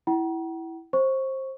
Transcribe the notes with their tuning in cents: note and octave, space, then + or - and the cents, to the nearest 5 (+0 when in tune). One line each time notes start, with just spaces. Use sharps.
E4 +0 F#5 +45 A#5 +40
C5 +20 C#6 +0